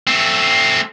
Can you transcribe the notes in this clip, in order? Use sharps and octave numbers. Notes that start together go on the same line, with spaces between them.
A3 C4